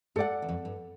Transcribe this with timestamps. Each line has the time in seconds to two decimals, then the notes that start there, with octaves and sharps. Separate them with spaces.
0.16 G#2 A4 D5 F#5
0.42 E2
0.49 F2
0.65 G2